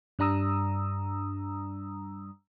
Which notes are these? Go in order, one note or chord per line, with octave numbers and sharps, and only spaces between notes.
G2 G3 D4 A#5 D#6 E6